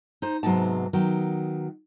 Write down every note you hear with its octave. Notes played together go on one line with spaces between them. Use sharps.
D#4 C5
G#2 C3 F#3 B3 D#4 A5
D#3 F#3 B3